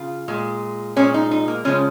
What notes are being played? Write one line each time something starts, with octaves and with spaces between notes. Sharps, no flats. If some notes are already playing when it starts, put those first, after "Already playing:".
Already playing: C#3 F4
A#2 G#3
A#2 F3 G#3 C#4
D#4
D#4
A#3
C#3 F3 G#3 C#4